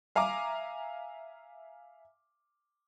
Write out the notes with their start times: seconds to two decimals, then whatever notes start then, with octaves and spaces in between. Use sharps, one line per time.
0.15 E5 F5 G#5 A#5 D6